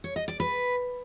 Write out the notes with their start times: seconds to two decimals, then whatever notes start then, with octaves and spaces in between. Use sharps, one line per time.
0.04 C#5
0.16 D#5
0.28 D5
0.40 B4